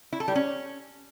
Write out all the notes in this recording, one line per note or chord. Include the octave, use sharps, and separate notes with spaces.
E4
A4
G3
C#4